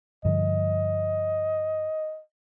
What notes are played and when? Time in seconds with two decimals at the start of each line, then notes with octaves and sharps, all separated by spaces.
0.25 G2 D3 F3 D#5